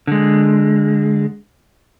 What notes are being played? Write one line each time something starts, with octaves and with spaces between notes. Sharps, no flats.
D3 G#3